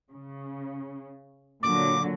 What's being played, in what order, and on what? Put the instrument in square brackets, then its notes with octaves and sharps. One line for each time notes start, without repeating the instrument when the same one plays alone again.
[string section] C#3
[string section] A#2 D3 F#3 [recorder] D6